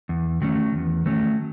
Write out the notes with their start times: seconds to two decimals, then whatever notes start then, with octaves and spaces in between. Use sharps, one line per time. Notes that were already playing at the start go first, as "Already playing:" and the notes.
0.09 E2
0.41 D#3 F#3 A3 C#4
0.74 E2
1.06 D#3 F#3 A3 C#4